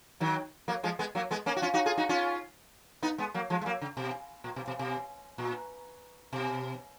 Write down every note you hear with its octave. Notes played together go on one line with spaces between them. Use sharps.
D#3 F#3
F#3 A#3
F3 G#3
G#3 B3
F#3 A#3
G#3 B3
A#3 C#4
F#4
C#4 F4
D#4 F#4
F4 G#4
D#4 F#4
C#4 F4
B3 D#4
G#3 B3
F#3 A#3
F3 G#3
G#3
F#3 A#3
C#3
B2
A#2
B2
B2
B2
A#2
B2